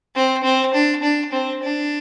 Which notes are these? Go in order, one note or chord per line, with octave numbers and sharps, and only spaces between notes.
C4
C4
D4
D4
C4
D4